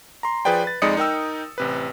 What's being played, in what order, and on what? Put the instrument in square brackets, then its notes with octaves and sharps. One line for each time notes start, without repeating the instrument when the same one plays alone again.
[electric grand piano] A#5 C6
F3 G#4 B4 D5 G5
B4 A6
F2 G#3 D#4 D5 D#6 C#7
D#4 A#4 G5 E6
A1 C3 B4